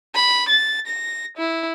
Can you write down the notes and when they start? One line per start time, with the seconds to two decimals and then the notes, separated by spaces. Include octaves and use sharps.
0.15 B5
0.49 A6
0.87 A#6
1.37 E4